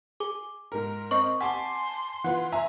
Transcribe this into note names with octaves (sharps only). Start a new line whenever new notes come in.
G#4 D6
G#2 A#4
C4 D#5 C#6
F#5 G#5 A5 C6 D6
E3 F4 B4 F#5
E5 G#5 A#5